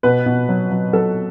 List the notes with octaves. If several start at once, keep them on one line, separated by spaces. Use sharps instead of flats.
B2 B4
B2
F#3
F#3
F#3 A4